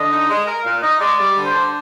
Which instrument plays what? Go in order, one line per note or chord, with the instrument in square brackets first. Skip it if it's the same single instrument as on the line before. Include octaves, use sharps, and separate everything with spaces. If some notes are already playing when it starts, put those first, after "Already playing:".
Already playing: [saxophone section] D3 [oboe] D#5
[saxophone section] D#4
G#3
A#4
[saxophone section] A#2 [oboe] F5
[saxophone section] D#4 [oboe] D#5
[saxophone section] G#3 [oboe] D5
[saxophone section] G3 [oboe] D5
[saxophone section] D3
[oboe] C5
[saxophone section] D4